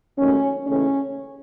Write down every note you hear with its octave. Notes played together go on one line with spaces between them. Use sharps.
D#2 D#3 F#3 A3 C#4
D#2 C#3 E3 A3 C#4